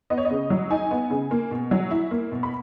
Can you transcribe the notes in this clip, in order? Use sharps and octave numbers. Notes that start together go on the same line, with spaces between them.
B3 D#5
C#5
D#5
C#3
F#3
D#4 G#5
B3
C#3
A#3
B2
F#3
E4
A#3
B2
B5